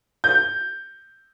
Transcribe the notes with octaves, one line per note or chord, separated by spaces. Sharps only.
G6